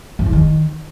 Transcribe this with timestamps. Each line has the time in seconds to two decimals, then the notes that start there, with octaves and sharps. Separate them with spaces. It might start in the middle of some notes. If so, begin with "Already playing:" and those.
0.19 F#2
0.26 E2
0.33 D#3